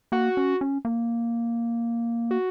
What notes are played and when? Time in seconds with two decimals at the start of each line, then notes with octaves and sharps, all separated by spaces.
0.12 A#3 F#4
0.37 C#4
0.61 C#4
0.85 A#3
2.31 F#4